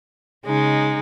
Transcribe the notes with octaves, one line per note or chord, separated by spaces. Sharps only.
C#3 G#3 D#4